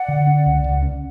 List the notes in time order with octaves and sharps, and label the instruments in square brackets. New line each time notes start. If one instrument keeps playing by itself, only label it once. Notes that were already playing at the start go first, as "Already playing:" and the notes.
Already playing: [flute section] D5 F#5
[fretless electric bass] D3
C#4
C#2
C#2
C#4